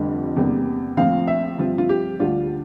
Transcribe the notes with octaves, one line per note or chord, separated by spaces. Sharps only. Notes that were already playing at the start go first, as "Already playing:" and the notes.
Already playing: F1 F2 D3 G3 D4
E2 C3 G3 A#3 D4
A#1 A2 F3 C4 F5
E5
G2 F3 C4 F4
F4
G4
D2 D3 G3 D4 F4